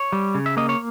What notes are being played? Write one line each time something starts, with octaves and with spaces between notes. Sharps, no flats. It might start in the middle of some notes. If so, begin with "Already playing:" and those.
Already playing: C#5
G3
C#3
E5
A#3 D#5
C#5